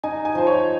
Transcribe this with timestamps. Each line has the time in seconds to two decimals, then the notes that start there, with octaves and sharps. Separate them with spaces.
0.03 D#4 G#5
0.25 G#5
0.35 F3 C5
0.47 C#5